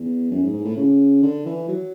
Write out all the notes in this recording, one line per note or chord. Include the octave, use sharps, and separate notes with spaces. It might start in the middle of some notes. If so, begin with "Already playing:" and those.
Already playing: E2
F#2
G#2
G#2
A2
C#3
D3
E3
F#3